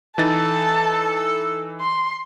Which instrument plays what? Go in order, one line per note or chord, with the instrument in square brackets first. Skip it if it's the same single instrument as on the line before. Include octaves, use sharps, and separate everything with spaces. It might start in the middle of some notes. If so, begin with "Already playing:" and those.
[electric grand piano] E3 D#4 A6 [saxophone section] A4 [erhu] A5
[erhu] C6